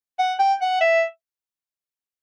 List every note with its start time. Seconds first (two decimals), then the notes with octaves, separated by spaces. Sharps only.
0.19 F#5
0.39 G5
0.61 F#5
0.81 E5